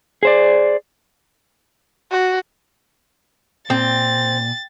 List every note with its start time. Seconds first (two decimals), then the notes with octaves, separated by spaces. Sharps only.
0.23 G#4 C5 D5
2.11 F#4
3.70 A#2 C4 A6